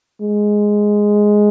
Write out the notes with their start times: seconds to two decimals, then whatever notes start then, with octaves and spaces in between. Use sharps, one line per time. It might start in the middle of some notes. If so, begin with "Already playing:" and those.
0.22 G#3